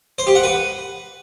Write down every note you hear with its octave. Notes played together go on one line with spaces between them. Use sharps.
C5
G4
F#5
B4